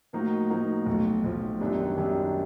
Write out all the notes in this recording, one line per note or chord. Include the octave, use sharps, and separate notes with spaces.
A2 F3 A#3 D#4 F#4
A2 F3 A#3 D#4 F#4
B1 A2 F3
B1 A2 F3
F#2 D#3 G3 B3 D4
F#2 D#3 G3 B3 D4